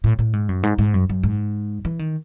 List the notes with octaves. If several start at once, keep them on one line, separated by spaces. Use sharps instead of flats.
A2
A2
G#2
F#2
G#2
G#2
F#2
F#2
G#2
E3
D#3